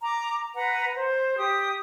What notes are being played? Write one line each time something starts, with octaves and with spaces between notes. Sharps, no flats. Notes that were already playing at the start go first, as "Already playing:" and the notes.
A#5 D6
B4 F#5 A#5
C5
G4 D#6